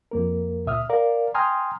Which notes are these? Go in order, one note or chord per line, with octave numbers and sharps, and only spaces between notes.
F2 A#3 A#4
C#2 A#2 E5 D#6 F6
A#4 D5 F5
G5 G#5 A#5 C6 D#6 F6